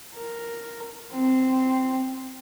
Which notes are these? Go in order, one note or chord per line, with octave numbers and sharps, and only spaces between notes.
A#4
C4